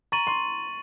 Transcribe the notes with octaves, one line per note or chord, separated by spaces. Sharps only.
A#5 C#6 A6 D#7 F#7
C6